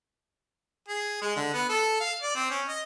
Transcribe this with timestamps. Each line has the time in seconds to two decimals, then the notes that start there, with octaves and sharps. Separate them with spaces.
0.88 G#4
1.22 G#3
1.36 D3
1.54 B3
1.69 A4
2.00 F5
2.22 D5
2.35 C4
2.50 C#4
2.68 D#5